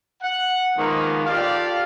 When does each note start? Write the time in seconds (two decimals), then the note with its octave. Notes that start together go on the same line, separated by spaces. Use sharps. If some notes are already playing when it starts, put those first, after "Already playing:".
0.23 F#5
0.78 D#3 F3 G#3 A#3 B3
1.26 F4 G4 A4 D5 F5